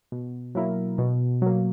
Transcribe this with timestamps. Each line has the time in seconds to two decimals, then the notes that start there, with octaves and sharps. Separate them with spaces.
0.12 B2
0.55 F#3 A#3 E4 A#4
0.98 B2
1.42 F#3 A#3